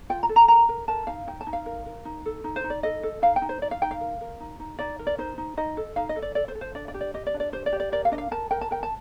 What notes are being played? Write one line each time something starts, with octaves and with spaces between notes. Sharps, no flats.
F4 G5
A#5
A4
A#5
A#4 A#5
A#4
A#4 A5
D#4 F5
D#4 G5
A5
D#4
F5
A#4
A#4
D#4
A4
D#4
C5
D#4
D5
A4 D#5
A4
D#4 F5
G5
D#4
C5
D#4 D5
F5
D#4 G5
F5
A#4
A#4
D#4
D#4
D#4 D5
A#4
D5
D#4 C5
D#4
D#4 D#5
A4
D#4 F5
D#5
A4
D5
A4 D5
C5
A4
C5
D4 D5
D5
G4
D5
G4 D#5
D5
D4
D5
G4 C5
D5
G4
D5
A#4 D5
F5
D4 D#5
F5
A#4 A5
A#4 G5
A5
A#4 G5
A5